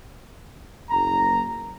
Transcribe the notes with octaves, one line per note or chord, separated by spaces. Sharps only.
F#1 A#5